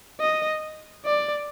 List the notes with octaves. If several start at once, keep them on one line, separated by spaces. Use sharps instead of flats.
D#5
D5